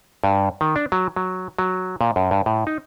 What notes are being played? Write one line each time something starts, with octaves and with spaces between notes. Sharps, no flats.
G2
D#3
D4
F#3
F#3
F#3
A#2
F#2
G2
A2
D#4